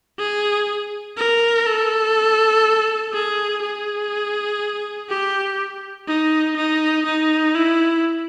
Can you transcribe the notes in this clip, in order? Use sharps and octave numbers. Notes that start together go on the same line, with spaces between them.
G#4
A#4
A4
G#4
G#4
G4
D#4
D#4
D#4
E4